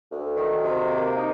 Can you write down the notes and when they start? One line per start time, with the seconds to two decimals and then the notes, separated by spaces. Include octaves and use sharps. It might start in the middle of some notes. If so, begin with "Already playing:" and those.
0.11 D2
0.37 D#3
0.64 C3
0.90 A#3
1.17 D#4